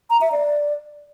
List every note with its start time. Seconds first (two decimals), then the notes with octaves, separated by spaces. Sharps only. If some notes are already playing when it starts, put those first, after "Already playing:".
0.10 A#5
0.21 E5
0.32 D5